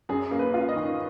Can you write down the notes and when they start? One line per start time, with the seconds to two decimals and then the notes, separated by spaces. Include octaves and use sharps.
0.09 F#2 G#4
0.31 A#3
0.39 B4
0.54 F4
0.69 D#5
0.76 D#3